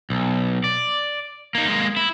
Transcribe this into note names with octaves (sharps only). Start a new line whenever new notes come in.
B1
D5
A#3 D#4
G#3 A#3
E4